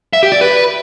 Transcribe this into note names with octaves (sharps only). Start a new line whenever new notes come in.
E5
G4
D5
B4